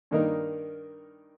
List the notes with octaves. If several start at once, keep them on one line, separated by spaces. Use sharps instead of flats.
G2 D#3 A#3 D#4 A#4